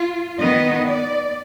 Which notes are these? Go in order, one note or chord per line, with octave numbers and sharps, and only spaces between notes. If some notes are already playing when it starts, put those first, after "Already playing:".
Already playing: F4
D#3 B3 D#5
D5